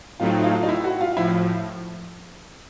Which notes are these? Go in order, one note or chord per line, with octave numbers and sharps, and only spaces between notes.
A2 F#3 A3 C4 D#4 F4
F4
D#4
E4
F#4
F4
A2 F3 E4